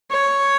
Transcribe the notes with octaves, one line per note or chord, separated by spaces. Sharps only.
C#5